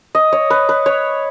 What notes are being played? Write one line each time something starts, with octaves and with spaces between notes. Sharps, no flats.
D#5
C#5
B4
B4
C#5